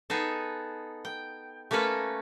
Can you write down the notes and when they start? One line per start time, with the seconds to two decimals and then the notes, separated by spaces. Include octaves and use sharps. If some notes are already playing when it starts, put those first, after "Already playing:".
0.10 B3 D#4 G#4 A4
1.05 G5
1.71 A3 A#3 C#4 A4 B4